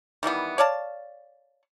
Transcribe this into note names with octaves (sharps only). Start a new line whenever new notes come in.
D#3 E3 G3 B3
C#5 D5 F5 A5